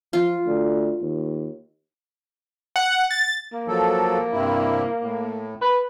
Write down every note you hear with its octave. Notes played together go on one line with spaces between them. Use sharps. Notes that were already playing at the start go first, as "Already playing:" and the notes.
F3 F4
D2
D#2
F#5
A6
A#3
F3 F#3 A4
G2 C3 E4
A2
B4